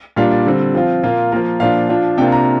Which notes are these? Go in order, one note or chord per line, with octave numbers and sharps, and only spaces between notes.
A#2 G3 D4 F4 F5
D5
D3 G3 C4
F3 C4 F4
A#2 A#3 F4
F3 A#3 F4 A#4
A#2 F3 D4 F4 F5
F3 D4 F4
C3 A#3 D4 F4 G5
A#5